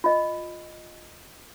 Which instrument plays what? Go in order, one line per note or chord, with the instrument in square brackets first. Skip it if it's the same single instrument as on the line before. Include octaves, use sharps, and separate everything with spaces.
[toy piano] F4 D#5